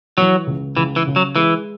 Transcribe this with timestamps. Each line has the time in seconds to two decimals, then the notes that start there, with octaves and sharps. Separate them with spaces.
0.18 E3 F#3
0.47 C#2
0.77 C#2 E3
0.96 E3
1.07 C#3
1.16 F#3
1.36 E3 G#3